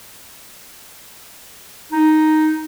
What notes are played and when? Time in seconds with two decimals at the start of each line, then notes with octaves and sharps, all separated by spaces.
1.92 D#4